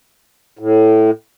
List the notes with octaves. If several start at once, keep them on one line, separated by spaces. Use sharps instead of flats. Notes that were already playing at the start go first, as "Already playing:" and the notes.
A2